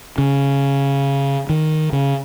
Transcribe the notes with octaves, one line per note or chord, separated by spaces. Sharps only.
C#3
D#3
C#3